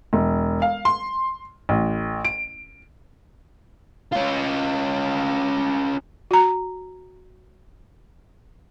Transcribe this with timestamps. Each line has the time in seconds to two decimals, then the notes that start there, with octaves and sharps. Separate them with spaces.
0.13 E1
0.62 F5
0.85 C6
1.69 A1
2.25 D7
4.13 C#4 F4
6.31 F#4 A#5